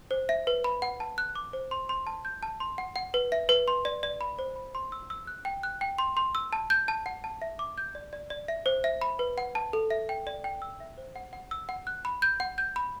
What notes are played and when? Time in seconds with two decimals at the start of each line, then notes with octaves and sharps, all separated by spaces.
0.11 C5
0.29 E5
0.47 B4
0.64 B5
0.82 F#5
1.00 A5
1.18 F#6
1.35 D6
1.53 C5
1.71 C6
1.89 C6
2.07 A5
2.25 G6
2.43 A5
2.60 C6
2.78 F#5
2.96 F#5
3.14 B4
3.32 E5
3.49 B4
3.68 C6
3.85 D5
4.03 D5
4.21 B5
4.39 C5
4.56 B5
4.75 C6
4.92 E6
5.10 E6
5.27 F#6
5.45 G5
5.63 F#6
5.81 G5
5.98 C6
6.17 C6
6.35 E6
6.53 A5
6.70 G6
6.88 A5
7.06 F#5
7.24 A5
7.42 E5
7.59 D6
7.78 G6
7.95 D5
8.13 D5
8.30 D5
8.48 E5
8.66 C5
8.84 E5
9.01 B5
9.19 B4
9.38 F#5
9.55 A5
9.73 A4
9.90 E5
10.09 G5
10.27 D5
10.44 G5
10.62 E6
10.80 E5
10.98 C5
11.16 F#5
11.33 F#5
11.51 E6
11.69 F#5
11.87 F#6
12.05 B5
12.22 G6
12.40 F#5
12.58 G6
12.76 B5